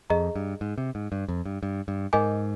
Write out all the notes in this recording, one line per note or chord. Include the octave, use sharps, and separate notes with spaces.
F2 G#4 D#5 A#5
G2
G#2
C3
G#2
G2
F2
G2
G2
G2
G#2 A#4 D#5 G#5 D6 G6